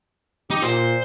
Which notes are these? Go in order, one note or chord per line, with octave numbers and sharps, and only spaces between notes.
D#4 G4
A#2 C5